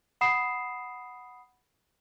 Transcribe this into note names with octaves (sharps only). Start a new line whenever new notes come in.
F#5 B5 D#6 C7 E7